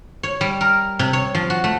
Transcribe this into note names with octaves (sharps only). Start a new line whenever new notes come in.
C#5
G3
A#4
C3
C#5
F3
F#4
A3